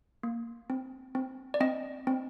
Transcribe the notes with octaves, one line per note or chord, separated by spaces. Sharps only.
A#3
C4
C4
D5
C4 D#5
C4